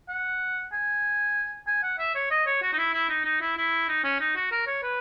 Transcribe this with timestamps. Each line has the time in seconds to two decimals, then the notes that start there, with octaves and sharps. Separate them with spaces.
0.09 F#5
0.72 G#5
1.67 G#5
1.83 F#5
1.98 E5
2.15 C#5
2.30 D#5
2.46 C#5
2.62 F#4
2.73 D#4
2.78 E4
2.94 E4
3.09 D#4
3.25 D#4
3.41 E4
3.57 E4
3.88 D#4
4.04 C#4
4.20 D#4
4.36 F#4
4.51 A#4
4.67 C#5
4.83 B4